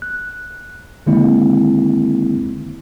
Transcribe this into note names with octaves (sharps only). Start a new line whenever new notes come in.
F#6
D3 D#3 G#3 A#3 C4 E4